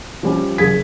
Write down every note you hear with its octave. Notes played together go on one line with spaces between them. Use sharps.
F3 G3 C#4
F#1 G#4 G#6 B6